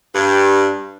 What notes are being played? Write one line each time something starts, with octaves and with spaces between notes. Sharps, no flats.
G2